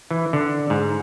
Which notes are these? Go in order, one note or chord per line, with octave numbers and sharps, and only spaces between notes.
E3
D3
G#2